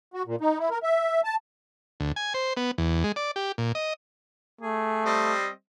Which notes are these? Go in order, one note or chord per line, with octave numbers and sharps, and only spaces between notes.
F#4
A#2
D#4
E4
A#4
E5
A5
D2
G#5
C5
B3
E2
G#3
D5
G4
A#2
D#5
A3 G#4
G3 C4 D#5